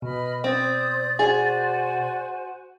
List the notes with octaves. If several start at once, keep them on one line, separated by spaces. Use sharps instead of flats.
B2 B4 D#5 B5 F6
C4 C5 D5 D#6 G6
F#4 G#4 C5 G#5